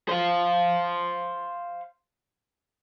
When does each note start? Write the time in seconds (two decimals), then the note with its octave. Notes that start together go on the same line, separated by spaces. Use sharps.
0.08 C5 F5